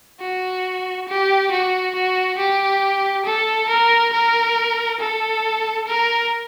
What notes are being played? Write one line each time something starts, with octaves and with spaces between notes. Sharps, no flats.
F#4
G4
F#4
F#4
G4
A4
A#4
A#4
A4
A#4